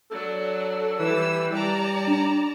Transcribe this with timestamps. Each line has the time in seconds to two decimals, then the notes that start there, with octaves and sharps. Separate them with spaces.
0.11 F#3 D4 A4
0.99 E3 G3 E6
1.52 G3 D5 A5 A#5
2.07 D4